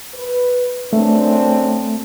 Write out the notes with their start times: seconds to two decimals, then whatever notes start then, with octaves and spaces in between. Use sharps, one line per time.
0.14 B4
0.93 F#2 A3 C4 D4